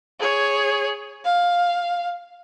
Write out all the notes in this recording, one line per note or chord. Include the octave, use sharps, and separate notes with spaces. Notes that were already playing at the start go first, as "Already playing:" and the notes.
G#4 C#5
F5